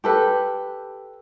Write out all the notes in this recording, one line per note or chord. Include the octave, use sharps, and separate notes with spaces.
G4 A4 B4